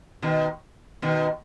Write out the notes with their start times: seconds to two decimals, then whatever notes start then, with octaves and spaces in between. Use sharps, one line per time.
0.22 B2 D#3
1.02 B2 D#3